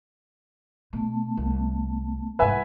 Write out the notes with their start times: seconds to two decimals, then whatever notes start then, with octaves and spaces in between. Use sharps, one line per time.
0.93 B2 A3 B3 A5
1.37 C2
2.39 C2 G#2 E4 B4 E5 F#5 G#5